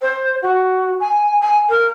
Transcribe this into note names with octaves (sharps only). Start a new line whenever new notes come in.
C5
F#4
G#5
G#5
A#4